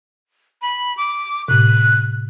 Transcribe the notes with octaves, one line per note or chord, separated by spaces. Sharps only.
B5
D6
A2 C3 F#6